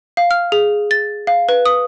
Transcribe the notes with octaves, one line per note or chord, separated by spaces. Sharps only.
F5
F6
G#4
A6
F5
B4
D#6